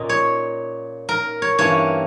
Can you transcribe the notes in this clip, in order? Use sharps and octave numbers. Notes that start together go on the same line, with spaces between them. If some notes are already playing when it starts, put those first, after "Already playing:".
Already playing: A#2 A#3 C#4 D#5
C#5
A#4
C#5
G2 E3 A#3 C#4 C#5